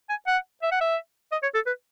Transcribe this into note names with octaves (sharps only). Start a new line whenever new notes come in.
G#5
F#5
E5
F#5
E5
D#5
C#5
A4
B4